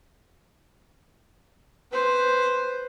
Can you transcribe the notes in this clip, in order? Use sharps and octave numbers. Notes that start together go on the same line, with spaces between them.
B4 C5